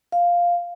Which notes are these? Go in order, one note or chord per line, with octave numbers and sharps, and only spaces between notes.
F5